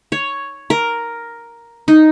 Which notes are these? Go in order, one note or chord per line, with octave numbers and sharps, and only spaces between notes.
C#5
A#4
D#4